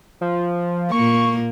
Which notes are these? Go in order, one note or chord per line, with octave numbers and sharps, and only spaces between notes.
F3
A#2 A#3 C#6